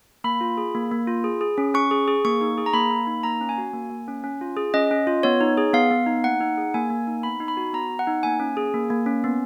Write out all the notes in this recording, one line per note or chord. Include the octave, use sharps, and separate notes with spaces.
A#3 B5
F4
G#4
A#3
A#3
F4
G#4
G#4
C#4
C#4 C#6
G#4
G#4
A#3 C#6
D#4
G#4
A#5
A#3 B5
A#3
D#4
A#3 A#5
C#4
G#5
F#4
A#3
A#3
C#4
C#4
F4
G#4
C#4 D#5
C#4
F4
B3 C#5
D#4
G#4
B3 F5
B3
D#4
A#3 F#5
D#4
G#4
A#3 G#5
A#3
D#4
B3 B5
D#4
B5
F#4
B3 A#5
B3
F#5
D#4
A#3 G#5
C#4
G#4
A#3
A#3
C#4
B3